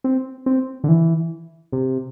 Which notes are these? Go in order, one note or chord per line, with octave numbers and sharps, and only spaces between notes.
C4
C4
D3
E3
C3